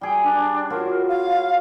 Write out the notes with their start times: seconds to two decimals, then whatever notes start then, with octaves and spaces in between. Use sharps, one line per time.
0.01 G3 G#4 G5
0.23 D4
0.70 F4 F#4 A#4 C#5
1.08 F5